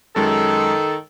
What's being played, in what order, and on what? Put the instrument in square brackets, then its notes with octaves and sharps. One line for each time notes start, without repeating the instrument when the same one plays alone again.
[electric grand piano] F#2 G#3 [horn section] D#3 A4